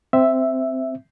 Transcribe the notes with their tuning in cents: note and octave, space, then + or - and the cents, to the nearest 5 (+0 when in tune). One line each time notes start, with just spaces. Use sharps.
C4 -10 E5 +0